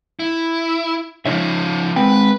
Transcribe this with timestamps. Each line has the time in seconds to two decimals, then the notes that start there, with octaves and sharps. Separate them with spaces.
0.20 E4
1.25 C#3 F3 D#4 C#5 E5
1.96 G#3 C4 B4 G5